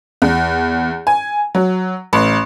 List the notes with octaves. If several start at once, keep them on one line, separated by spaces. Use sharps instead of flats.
E2
G#5
F#3
A1